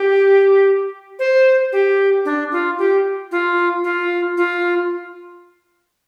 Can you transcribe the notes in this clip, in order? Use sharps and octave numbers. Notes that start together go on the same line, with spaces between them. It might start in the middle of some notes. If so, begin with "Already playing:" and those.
Already playing: G4
C5
G4
D4
F4
G4
F4
F4
F4